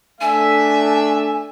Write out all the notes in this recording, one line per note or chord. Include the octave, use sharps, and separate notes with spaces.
A3 D4 E5 G#5